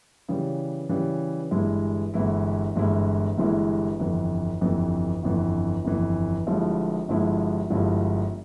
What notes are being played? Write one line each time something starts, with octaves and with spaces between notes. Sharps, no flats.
C#3 E3 G3
C#3 E3 G3
G1 G2 E3 G#3 E4
G1 G2 E3 G#3 E4
G1 G2 E3 G#3 E4
G1 G2 E3 G#3 E4
G1 F2 E3
G1 F2 E3
G1 F2 E3
G1 F2 E3
G1 G2 F3 G#3 E4
G1 G2 F3 G#3 E4
G1 G2 F3 G#3 E4